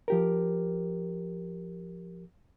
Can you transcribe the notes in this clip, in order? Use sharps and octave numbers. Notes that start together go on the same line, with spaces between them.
F3 G4 A#4